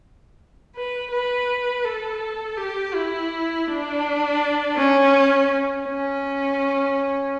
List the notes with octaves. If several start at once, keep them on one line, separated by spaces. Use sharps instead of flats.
B4
B4
A4
G4
E4
D4
C#4
C#4